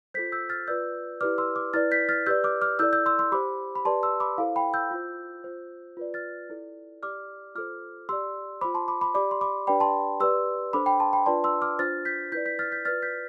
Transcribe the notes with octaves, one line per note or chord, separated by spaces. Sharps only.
F4 A4 C5 G6 B6
E6 G6
F6 A6
F4 B4 D5 E6 G6
E4 G4 B4 D5 D6 F6
C6 E6
D6 F6
E4 B4 D5 F6 A6
G6 B6
F6 A6
G4 B4 D5 E6 G6
D6 F6
D6 F6
E4 A4 D5 E6 G6
E6 G6
C6 E6
C6 E6
G4 C5 B5 D6
B5
G4 B4 D5 A5 C6
C6 E6
B5 D6
E4 A4 C5 F5
G5 B5
E6 G6
F4 C5
F4 C5
F4 B4 D5
F6 A6
E4 A4 D5
G4 D5 D6 F6
F4 A4 C5 D6 F6
G4 D5 C6 E6
F4 C5 B5 D6
A5 C6
B5 D6
B5 D6
G4 D5 B5 D6
C6
B5 D6
D4 G4 B4 D5 G5 B5
A5 C6
G4 B4 D5 C6 E6
D4 A4 C5 B5 D6
G5 B5
A5 C6
G5 B5
D4 F4 B4 D5 A5 C6
C6 E6
D6 F6
D4 F4 C5 F6 A6
G6 B6
E4 B4 D5 G6 B6
G6 B6
F6 A6
G6 B6
F4 B4 D5 F6 A6
G6 B6